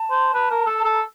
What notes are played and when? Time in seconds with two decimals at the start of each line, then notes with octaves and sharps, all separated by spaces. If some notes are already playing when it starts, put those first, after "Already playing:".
Already playing: A5
0.11 C5
0.34 B4
0.51 A#4
0.66 A4
0.84 A4
0.94 A#5